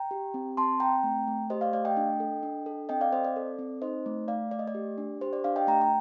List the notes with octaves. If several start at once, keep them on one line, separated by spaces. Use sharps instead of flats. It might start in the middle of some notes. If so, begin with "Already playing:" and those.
Already playing: G5 A#5
G4
C4
C4 A5 C6
C4 G5 A#5
A3
A3
G4 C5 D#5
D5 F5
A3 D5 F5
D#5 G5
D4
A4
D4
A4
C4 D#5 G5
D5 F5
C4 C5 D#5
D5
A4
C4
D#4 C5 D#5
A3
A3 D5 F5
A3 D5
D#5
D5
G4
D4
G4 C5
D5
D4 D5 F5
D#5 G5
A3 G5 A#5
A#5